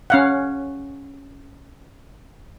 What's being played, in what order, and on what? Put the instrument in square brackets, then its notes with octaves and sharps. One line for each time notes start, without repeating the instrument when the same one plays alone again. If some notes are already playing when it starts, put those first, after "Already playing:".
[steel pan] C#4 F5 F#5